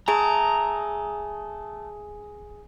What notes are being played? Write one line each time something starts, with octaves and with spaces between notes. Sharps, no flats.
A3 G#4 G#5 A#5